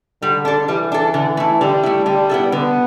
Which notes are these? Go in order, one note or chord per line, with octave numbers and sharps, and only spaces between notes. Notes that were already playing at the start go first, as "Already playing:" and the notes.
D3 G3
D4 A4
E3 G3
D4 A4
D3
A3 E4
D3 G3
A3 E4
D3 G3
B3 E4 A4
D3 B3